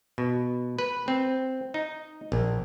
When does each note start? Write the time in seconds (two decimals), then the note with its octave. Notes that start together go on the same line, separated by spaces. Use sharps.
0.18 B2
0.79 B4
1.08 C4
1.74 D#4
2.32 A#1